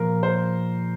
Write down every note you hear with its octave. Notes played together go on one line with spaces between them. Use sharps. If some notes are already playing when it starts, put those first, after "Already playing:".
Already playing: A#2 F3 A#4
C5